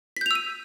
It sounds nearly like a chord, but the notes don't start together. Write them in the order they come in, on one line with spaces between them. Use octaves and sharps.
B6 G6 F7 E6 D#7